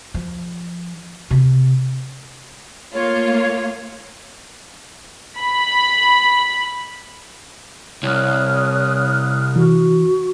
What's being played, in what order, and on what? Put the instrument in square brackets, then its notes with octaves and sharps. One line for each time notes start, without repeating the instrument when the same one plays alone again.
[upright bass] F3
C3
[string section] A3 A#3 F4 [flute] C#5
[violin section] B5
[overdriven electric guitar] C2 [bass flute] C#5 [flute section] D#6 F6 F#6
[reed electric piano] E3 [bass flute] F#4